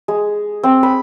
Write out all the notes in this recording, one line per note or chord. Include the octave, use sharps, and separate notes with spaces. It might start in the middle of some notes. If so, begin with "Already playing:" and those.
G#3
C4
B5